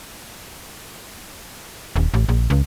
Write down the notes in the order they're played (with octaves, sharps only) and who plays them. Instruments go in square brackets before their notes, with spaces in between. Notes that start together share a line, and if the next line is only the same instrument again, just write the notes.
[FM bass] D#1
A1
A#1
C#2